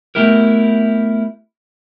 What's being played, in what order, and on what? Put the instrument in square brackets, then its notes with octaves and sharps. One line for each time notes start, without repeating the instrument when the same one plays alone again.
[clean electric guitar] A3 B3 E4 G4 A#4